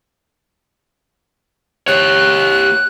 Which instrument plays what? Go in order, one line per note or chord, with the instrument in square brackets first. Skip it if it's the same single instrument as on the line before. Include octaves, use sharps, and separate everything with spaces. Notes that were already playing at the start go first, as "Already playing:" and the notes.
[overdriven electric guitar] G4 C#5 [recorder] F#6